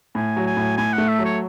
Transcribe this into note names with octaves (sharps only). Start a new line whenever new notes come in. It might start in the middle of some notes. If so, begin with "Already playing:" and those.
A2 G#5
F#3
G#5
A2
A2 G#5
A3 F#5
E5
F#3
C#5